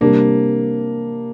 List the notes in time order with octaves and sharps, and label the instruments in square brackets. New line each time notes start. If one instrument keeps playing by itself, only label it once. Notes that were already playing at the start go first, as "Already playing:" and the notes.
[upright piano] C3 G3 D4 [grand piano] A#3